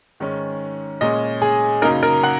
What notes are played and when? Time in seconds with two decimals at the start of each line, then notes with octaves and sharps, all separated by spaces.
0.20 G#2 D#3 G#3 C#4
1.01 A#2 G#3 C#4 D#5
1.42 G#4
1.82 F#2 C#3 A#3 D#4 A#4
2.03 A#4
2.24 F#5